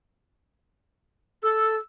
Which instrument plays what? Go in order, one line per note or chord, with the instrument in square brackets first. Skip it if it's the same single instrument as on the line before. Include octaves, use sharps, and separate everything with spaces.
[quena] A4 [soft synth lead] E6